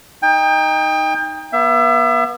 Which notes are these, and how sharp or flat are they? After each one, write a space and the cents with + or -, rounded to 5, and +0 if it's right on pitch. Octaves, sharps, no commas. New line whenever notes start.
D#4 +0 G5 +30
B3 -35 E5 +30